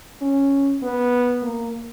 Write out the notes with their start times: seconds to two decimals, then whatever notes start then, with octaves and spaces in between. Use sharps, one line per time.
0.21 C#4
0.82 B3
1.43 A#3